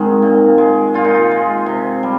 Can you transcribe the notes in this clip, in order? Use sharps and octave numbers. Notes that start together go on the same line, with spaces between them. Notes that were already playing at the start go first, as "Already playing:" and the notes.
Already playing: G#2 D#3 G#3 C4 D#4
A#2
G#3
A#2 F4
D#4
F4
G#3
C3
G3